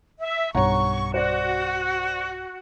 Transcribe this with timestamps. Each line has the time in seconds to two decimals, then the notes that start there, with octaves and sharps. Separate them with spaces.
0.20 E5
0.55 B1 G2 C#5 F#5 A#5 C#6
1.14 F#4 C5 D5